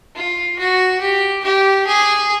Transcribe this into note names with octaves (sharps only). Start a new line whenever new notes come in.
F4
F#4
G4
G4
G#4